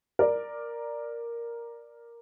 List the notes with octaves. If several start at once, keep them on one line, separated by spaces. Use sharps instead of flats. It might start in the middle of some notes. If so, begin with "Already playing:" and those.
A#4 D5